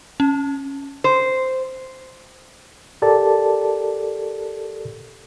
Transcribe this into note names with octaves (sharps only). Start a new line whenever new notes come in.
C#4
C5
G4 A4 A#4 D5 A5